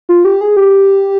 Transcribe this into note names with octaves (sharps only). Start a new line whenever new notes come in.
F4
G4
G#4
G4